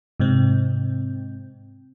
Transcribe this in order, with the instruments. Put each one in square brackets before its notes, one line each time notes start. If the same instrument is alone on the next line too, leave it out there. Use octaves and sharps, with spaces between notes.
[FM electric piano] G#2 C3 C4